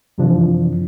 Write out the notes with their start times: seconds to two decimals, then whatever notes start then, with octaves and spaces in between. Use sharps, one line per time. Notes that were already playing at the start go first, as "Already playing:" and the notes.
0.18 F#2 C3 E3 F3 D4